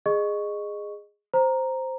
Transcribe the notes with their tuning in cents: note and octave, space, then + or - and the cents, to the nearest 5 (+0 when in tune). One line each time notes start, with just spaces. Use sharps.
G#4 -5 D#5 -20 C#6 +5
C5 +0 A#5 +0